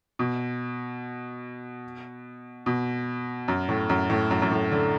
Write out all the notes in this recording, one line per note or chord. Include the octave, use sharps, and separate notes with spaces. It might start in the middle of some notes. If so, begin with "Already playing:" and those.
B2
B2
F#2
A2
F#2
A2
F#2
F#2
A2
D3